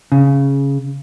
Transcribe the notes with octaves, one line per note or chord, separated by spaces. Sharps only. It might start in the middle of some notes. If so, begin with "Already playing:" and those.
C#3